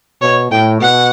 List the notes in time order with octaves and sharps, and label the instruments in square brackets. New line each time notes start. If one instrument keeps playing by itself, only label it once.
[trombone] B2 [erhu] C#5
[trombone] A2 [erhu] G5
[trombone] B2 [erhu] F#5